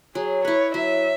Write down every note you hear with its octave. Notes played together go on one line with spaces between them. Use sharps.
F#3 G#4
E4 B4 C#5
F#3 E5